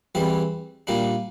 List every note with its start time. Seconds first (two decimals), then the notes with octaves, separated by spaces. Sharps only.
0.15 E2 E3 G3 C4
0.87 A#2 G3 A#3 D4